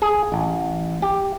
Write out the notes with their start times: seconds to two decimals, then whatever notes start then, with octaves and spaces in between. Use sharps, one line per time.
0.02 G#4
0.32 A1
1.02 G4